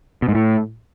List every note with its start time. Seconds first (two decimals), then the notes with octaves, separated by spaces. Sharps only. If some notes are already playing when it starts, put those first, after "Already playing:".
0.22 B2
0.28 G#2
0.35 A2